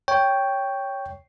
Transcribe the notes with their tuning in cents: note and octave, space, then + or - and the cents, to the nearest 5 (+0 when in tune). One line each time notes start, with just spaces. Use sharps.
C#5 +5 G5 +0